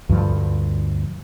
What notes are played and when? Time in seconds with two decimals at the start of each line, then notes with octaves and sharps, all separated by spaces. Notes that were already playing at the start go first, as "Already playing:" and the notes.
0.09 D2 G2 F3